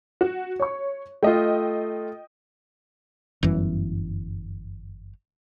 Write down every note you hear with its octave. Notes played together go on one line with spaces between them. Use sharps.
F#4
C#5 C#6
A3 F4 D#5 G5
G1 F#2 E3